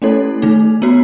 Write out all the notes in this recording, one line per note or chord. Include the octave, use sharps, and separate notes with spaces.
A3 C#4 E4 A4 C#5
D#3 A3 D#4
B3 F#4 C#5